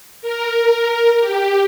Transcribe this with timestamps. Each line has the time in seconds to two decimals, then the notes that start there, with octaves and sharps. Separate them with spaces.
0.22 A#4
1.20 G4